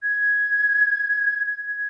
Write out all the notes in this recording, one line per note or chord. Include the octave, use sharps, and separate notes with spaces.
G#6
G#6